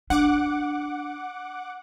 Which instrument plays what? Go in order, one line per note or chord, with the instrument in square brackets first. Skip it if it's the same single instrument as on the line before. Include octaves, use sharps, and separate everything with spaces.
[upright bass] D4 [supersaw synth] F#5 D6